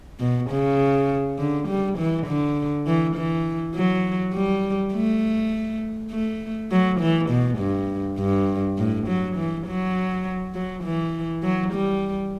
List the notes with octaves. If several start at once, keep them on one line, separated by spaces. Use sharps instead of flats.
B2
C#3
D3
G3
E3
D3
E3
E3
F#3
G3
A3
A3
F#3
E3
B2
G2
G2
A2
F#3
E3
F#3
F#3
E3
F#3
G3